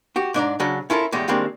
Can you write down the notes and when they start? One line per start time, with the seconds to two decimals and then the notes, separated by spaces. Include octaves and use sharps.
0.16 F#4 G4
0.34 G#2 D4 D5 A#5
0.60 C#3 F#3 C#4 D4
0.90 C#4 E4 F4 A4 A#4
1.12 E2 A2 G3 G#3
1.28 D#3 G3 G#3 A#3 C4 D4